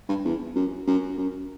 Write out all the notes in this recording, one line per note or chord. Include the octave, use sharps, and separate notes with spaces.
G2
E2
F#2
F#2
F#2